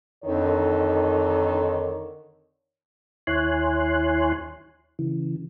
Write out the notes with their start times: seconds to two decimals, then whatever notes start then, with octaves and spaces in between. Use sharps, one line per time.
0.24 F2 D3 D#3 C#5
3.27 D#2 E4 C#5 G#5 C6 F#6
4.99 C#3 E3